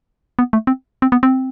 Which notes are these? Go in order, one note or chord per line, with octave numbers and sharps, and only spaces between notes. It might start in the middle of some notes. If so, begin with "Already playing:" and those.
B3
A3
C4
C4
B3
C4